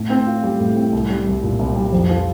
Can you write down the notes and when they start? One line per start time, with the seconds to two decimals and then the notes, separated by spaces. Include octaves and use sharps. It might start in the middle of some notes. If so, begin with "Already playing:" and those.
Already playing: A2 A3
0.10 C4
0.27 F4
0.44 G3
0.60 A2
0.76 C4
0.93 C2
1.10 G3
1.27 C2
1.43 A#2
1.59 C2
1.76 G3
1.93 F2
2.09 F3